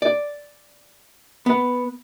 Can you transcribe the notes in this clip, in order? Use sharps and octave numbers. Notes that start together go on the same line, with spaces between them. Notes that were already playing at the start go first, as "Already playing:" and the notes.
D5
B3